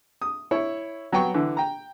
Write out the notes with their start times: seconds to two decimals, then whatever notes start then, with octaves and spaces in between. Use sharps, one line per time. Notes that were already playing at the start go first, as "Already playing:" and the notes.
0.22 D#6
0.51 E4 C#5
1.12 F#3 B3 G5 C#6
1.34 D3 E3
1.57 G5 A#5